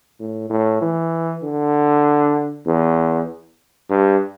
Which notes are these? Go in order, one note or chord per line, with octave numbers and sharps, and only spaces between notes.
A2
A2
E3
D3
E2
G2